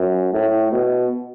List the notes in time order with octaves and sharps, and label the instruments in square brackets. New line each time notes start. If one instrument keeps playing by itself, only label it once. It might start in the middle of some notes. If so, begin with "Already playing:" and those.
Already playing: [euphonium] F#2
A2
B2